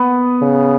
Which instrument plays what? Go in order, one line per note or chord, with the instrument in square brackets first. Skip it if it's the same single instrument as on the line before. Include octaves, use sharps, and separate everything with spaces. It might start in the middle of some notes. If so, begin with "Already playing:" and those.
Already playing: [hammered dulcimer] B3
[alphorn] C#3